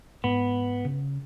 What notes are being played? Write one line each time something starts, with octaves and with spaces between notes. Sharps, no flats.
G#2 B3
C#3